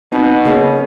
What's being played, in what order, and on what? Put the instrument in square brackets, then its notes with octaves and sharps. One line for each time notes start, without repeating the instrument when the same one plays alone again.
[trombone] B2 [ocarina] C4 [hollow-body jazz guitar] D#4
[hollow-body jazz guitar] C#3 A#3 C#4 [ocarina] G#4